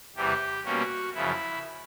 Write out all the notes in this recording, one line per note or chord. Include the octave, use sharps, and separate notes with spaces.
E2 C3 E3 G3 G4
B2 G3 A#3 C#4 F#4
F#2 C#3 F3 E4